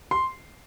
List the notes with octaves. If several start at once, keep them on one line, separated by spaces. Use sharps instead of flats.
C6